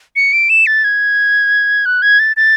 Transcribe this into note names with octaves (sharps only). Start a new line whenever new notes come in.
C#7
D7
E7
A6
G#6
F#6
G#6
A6
A6